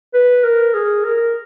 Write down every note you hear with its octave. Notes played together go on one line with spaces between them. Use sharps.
B4
A#4
G#4
A#4